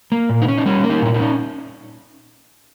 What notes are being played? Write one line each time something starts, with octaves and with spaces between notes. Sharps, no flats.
A#3
A#2
D#4
C#4
D#4
G3 C#4
A#3
D#4
A#2 E4
D#4
C#4